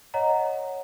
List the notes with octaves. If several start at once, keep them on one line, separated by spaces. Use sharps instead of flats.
C#5 D#5 F#5 A#5